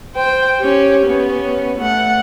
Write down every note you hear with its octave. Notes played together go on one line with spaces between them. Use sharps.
C5 G5
C#4 G4
B3 C#4
A3 F#5